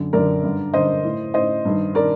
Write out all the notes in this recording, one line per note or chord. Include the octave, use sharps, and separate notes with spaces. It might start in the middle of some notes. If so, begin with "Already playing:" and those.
Already playing: F#2 D3
F#2 D3 A#4 D5
G2 D3
G2 D3 C5 D#5
A2
A2 C5 D#5
G2 D#3
D#3 A#4 D5